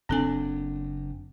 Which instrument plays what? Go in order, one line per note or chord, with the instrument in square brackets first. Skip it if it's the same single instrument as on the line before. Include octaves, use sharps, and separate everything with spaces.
[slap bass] F#1 D4 [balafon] C4 A4 G#5